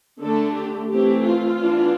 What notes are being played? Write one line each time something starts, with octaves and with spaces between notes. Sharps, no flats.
D3 A3 D4 A4
G4
E3 A3 C4 G4
F4
E3 B3 D4